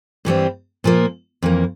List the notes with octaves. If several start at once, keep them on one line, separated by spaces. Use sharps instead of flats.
G2 E3 G3 C4
A#2 F3 A#3
F2 E3 A#3